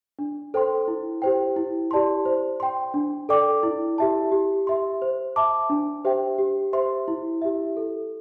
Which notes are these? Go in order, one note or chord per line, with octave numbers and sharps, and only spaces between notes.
D4
A4 C5 G5 C6
E4
G4 C5 G5
E4
G4 D5 A5 C6
C5
G5 C6
D4
A4 D5 G5 D6
E4
G4 E5 A5
G4
E5 C6
C5
E5 A5 D6
D4
G4 C5 E5 G5
G4
C5 E5 C6
E4
G4 E5
A4